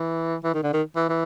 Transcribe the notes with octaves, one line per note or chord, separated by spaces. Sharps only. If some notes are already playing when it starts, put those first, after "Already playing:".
Already playing: E3
E3
D#3
D3
D#3
E3
E3